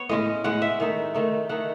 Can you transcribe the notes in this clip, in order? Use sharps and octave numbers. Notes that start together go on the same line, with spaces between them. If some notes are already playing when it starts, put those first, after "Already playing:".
Already playing: B3 C#5
A2 G#3 C#4 D#5
A2 G#3 C#4 F#5
E5
D#3 A3 D#4
D#3 A3 D#4
D#3 A3 D#4 F#5